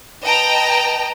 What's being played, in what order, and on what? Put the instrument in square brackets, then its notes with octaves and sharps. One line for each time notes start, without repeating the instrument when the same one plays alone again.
[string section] B4 D#5 G5 A5 A#5